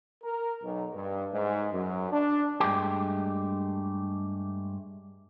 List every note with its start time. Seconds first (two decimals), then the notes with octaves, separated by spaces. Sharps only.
0.24 A#4
0.63 B1
0.94 G2
1.33 G#2
1.72 F#2
2.12 D4
2.60 G2 G#3 A3 G4